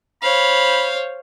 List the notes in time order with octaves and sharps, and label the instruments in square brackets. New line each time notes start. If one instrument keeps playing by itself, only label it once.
[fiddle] C5 C#5 [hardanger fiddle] F5 [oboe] B5